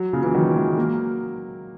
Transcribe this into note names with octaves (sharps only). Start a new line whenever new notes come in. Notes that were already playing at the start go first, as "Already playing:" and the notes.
Already playing: F#3
A#2 C#3
C#3 E3
D#3 F#3
E3 G#3
F#3 A#3